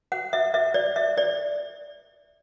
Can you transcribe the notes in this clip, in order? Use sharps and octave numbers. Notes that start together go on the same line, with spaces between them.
F#5
E5
E5
D5
E5
D5